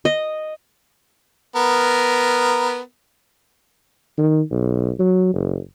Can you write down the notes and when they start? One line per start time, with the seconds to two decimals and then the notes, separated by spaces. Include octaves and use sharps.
0.05 D#5
1.56 B3 A#4
4.18 D#3
4.51 B1
4.99 F#3
5.34 F#1